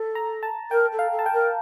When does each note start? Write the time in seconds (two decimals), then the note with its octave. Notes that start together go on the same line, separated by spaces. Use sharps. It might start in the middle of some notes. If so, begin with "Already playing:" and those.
Already playing: A4
0.15 A#5
0.43 A5
0.71 A#4 G5
0.92 A4
0.99 F5
1.12 A4
1.19 A5
1.26 G5
1.32 A#4